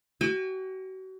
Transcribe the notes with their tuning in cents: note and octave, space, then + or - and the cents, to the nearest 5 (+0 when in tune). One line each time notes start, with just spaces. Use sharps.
F#4 +35 G#5 -45